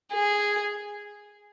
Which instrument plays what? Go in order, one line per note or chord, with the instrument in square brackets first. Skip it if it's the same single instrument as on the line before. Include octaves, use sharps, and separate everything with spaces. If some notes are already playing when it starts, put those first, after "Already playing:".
[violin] G#4